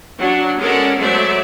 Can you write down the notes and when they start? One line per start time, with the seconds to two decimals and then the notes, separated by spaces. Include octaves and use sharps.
0.19 F#3 D4
0.60 G#3 C#4 A4 A#4 D5 F#5
0.97 F#3 G#3 A3 C5 D5 E5